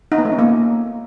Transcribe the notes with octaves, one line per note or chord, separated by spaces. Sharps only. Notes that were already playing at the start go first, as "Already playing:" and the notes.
D#4
B3
A3
C#4
A#3